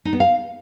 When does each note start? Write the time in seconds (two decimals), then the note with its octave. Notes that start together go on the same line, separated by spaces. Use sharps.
0.05 D#4
0.13 B3
0.20 F5